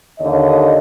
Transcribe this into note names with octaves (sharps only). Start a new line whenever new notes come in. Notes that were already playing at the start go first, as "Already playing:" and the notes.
D#2 D3 C#5 D#5